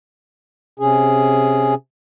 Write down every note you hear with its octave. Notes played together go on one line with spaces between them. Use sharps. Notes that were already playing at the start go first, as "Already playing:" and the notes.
C3 C#4 G#4